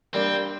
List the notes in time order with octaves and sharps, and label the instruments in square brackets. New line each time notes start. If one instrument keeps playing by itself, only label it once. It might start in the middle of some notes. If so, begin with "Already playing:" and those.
[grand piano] G3 A#3 D4 [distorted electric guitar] C4